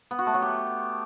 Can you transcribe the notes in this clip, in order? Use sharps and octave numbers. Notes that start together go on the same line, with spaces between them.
B3
F#4
A3
F#3
G4